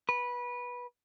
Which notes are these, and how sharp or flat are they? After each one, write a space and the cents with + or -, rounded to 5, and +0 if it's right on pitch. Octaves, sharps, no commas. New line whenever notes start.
B4 -15